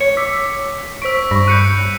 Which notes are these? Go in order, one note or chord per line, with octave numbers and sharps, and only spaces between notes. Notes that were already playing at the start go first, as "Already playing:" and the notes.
C#5 C#7
D6 E6 B6
C5 C#6 E6 B6 D7
G2 B5 C#6 A#6
F#6 G6 C#7 D#7